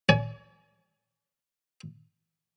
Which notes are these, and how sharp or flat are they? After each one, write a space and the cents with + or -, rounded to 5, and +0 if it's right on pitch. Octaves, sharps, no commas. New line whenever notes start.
C#5 +45 G#5 +25